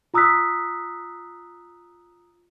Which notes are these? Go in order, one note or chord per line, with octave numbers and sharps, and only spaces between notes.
F4 A#5 D#6 E6 F#6 B6